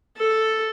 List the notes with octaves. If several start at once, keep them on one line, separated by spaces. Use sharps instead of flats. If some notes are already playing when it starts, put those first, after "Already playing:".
A4